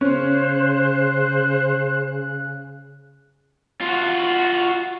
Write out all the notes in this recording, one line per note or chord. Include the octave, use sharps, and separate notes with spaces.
C#3 C#4 C5 F#6
F4 F#4